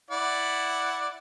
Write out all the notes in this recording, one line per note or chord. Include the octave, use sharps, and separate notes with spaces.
E4 D5 F#5